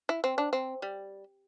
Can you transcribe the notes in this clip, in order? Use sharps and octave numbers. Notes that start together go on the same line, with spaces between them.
E4
C4
D4
C4
G3